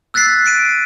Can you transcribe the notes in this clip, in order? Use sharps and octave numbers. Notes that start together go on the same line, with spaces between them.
E6 F#6 A6 B6 C7
B6 C7 D7 D#7